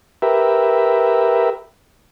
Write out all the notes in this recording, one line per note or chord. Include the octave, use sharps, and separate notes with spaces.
G4 A#4 B4 E5